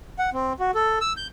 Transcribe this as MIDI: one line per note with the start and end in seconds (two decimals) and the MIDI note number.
0.19 0.30 78
0.33 0.53 60
0.60 0.71 66
0.75 0.99 69
1.01 1.13 88
1.17 1.27 91